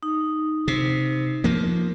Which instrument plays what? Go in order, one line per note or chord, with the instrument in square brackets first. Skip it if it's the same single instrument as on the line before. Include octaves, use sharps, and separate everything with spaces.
[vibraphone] D#4
[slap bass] C3
F3 A#3